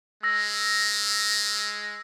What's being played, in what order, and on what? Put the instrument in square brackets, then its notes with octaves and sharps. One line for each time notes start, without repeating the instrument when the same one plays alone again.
[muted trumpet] G#3 [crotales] E6 A#6